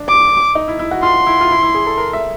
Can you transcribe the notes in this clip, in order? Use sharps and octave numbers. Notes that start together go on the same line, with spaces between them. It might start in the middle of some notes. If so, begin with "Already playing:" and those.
Already playing: D4
D6
D#4
E4
E4
F#4
F4 C6
E4
F4
E4
E4
G#4
A4
A#4
E5